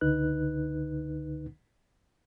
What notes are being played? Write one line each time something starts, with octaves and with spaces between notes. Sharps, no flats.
C#2 D3 D#4 B4 F#6